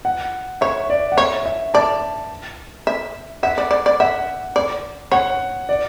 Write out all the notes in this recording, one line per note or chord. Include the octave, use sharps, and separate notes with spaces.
F#5
C#5 E5
D5
F#5
C#5 E5
E5
D5 A5
E5
E5 F#5
D5
D5
D5
E5 F#5
D5
C#5 F#5
D5